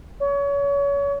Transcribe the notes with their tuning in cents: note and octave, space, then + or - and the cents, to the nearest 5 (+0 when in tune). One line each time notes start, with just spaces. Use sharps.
C#5 +30